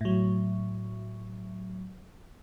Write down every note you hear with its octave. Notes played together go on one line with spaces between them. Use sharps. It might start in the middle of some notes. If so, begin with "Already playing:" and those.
A2 F#3